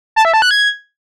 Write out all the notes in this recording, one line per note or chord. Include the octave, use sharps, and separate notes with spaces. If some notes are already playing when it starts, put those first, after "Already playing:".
A5
E5
A5
F#6
G#6